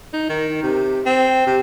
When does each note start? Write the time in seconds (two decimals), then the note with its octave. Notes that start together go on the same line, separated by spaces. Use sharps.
0.13 D#4
0.29 D#3
0.63 C3
1.06 C4
1.47 C3